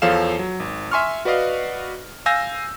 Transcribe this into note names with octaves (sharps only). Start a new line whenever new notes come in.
E2 F3 A4 C#5 F5 E7
F#3
G#1
E5 G#5 C6 C#6 F6
F#4 B4 D5 D#5 F5
F5 G#5 E6 G6 A#6